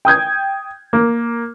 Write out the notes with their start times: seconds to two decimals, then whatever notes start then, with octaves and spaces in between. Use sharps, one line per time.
0.05 G5 D#6 G6 G#6
0.93 A#3